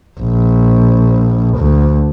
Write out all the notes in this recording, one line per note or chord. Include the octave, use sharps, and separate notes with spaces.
A#1
D2